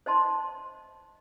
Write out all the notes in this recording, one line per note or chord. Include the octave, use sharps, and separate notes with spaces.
C5 D#5 A5 C6